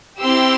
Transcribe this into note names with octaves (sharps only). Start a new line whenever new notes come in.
C4 E4 G4 C6 E6